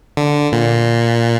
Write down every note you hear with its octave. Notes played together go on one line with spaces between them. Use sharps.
D3
A#2